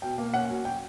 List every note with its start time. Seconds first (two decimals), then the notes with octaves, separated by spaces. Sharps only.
0.02 B2 G5
0.18 A#3
0.34 C#4 F#5
0.50 F#3
0.65 G5